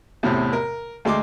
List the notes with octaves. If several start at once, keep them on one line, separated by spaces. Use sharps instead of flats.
E2 A2 C3
A#4
D2 G#3 C6 D6